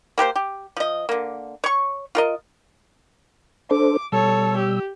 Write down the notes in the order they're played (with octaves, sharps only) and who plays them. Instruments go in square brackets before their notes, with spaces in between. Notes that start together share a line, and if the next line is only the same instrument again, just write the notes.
[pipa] A#3 G4 B4 C5
G4
F3 D#5
D3 A#3
C#5 C#6
F4 A#4 D#5
[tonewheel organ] D4 A4 C5 [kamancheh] D6
[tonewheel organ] B2 G3 E6 [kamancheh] A4 C#5
[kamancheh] G4